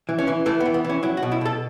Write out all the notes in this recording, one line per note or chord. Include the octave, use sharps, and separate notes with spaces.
E3
C#4
E3
E3 A3
B3
E3
B3
E3
C#4
F#3 E4
F#4
B2
E4
B2 A4